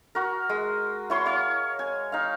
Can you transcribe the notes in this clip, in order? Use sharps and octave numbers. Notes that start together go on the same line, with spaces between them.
F#4 A#4
G#3
E4 C#5 C6
C#5 F5
G#5
D#4 F5